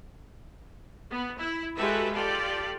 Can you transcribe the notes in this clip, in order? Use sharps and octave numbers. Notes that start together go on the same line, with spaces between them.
B3
E4
G#3 F#4 G4 A4 B4 E5
F4 G4 A4 D5